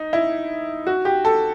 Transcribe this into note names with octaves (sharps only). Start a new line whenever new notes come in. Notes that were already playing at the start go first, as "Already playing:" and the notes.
Already playing: D#4
E4
F#4
G4
A4